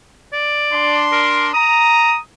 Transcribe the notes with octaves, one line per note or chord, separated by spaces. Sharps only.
D5
D4 C6
A#4
A#5 D#6